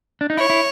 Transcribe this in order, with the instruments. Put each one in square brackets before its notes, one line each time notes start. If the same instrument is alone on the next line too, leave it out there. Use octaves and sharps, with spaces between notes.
[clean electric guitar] D4
D#4
[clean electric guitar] E4 [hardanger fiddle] C#5
[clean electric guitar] E4